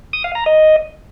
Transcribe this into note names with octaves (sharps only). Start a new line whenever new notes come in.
D#6
F5
A#5
D#5